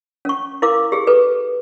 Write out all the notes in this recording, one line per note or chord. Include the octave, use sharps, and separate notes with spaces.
C#4 C#6
E4 A#4 F5 D6
G4 G#4
A4 B4